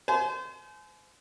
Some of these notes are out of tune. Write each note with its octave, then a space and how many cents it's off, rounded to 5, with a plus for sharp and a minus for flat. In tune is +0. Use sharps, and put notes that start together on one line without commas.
C5 -30 G#5 +35